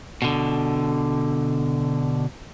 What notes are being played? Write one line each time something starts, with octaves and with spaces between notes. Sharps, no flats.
B2 D3